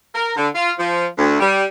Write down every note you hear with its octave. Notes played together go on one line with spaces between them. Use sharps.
A#4
D3
F4
F3
D2
G3